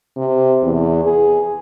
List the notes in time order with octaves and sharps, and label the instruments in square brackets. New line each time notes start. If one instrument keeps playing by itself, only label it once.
[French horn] C3
E2
G#4